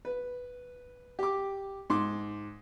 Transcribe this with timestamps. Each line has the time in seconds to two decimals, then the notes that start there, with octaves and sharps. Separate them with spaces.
0.05 B4
1.19 G4 D6
1.90 G#2 C6 D6